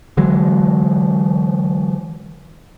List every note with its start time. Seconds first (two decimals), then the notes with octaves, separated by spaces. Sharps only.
0.17 D3 E3 F#3 G#3